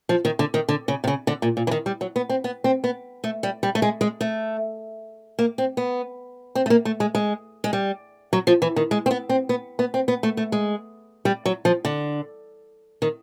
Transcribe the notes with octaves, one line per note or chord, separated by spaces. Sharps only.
F3
D#3
D3
D#3
D3
C#3
C3
C#3
D3
A#2
A#2
E3
D#3
G3
F#3
B3
C4
B3
C4
B3
A3
G3
G3
A3
G#3
G#3
A3
A#3
C4
B3
C4
A3
A#3
A3
G#3
G#3
G#3
G3
F#3
F3
E3
D#3
G#3
C4
B3
C4
B3
B3
C4
B3
A3
A3
G#3
G3
F#3
F3
D3
D#3